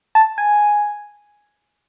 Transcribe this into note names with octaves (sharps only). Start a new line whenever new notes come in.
A5
G#5